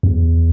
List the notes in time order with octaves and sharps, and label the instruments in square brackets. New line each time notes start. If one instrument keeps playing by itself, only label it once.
[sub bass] E2